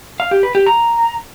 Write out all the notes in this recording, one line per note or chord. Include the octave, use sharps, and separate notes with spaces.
F5
G4
B4
G4
A#5